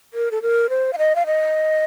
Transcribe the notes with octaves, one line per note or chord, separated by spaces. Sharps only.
A#4
A4
A#4
C5
F5
D#5
F5
D#5